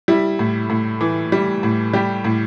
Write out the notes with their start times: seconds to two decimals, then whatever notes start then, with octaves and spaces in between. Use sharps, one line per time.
0.08 G3 E4
0.39 A2
0.70 A2
1.01 E3
1.32 G3
1.63 A2
1.93 G3 G4
2.25 A2